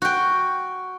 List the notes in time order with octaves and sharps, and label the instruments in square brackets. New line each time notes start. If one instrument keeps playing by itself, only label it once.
[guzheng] F#4 G5